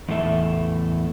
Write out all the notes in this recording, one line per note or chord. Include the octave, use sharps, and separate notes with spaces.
E2 A2 A4 E5